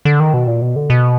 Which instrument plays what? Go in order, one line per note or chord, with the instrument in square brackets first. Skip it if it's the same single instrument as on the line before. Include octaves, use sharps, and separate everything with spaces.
[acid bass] D3
D#3
B2
A#2
B2
D3
B2